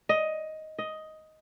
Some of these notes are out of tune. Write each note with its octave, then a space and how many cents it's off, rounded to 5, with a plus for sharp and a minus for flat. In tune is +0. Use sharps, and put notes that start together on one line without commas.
D#5 +10
D#5 +10